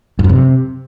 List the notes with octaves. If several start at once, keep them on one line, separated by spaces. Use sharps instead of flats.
G2
F#2
C3